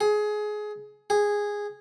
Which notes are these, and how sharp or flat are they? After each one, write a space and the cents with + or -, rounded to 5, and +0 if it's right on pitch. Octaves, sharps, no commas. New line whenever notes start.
G#4 +20
G#4 -10